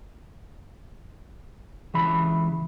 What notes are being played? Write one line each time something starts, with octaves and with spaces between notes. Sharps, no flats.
C#2 E3 B5